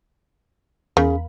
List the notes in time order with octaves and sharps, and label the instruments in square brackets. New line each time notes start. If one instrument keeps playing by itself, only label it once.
[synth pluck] E2 A#4 B5 [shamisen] C#3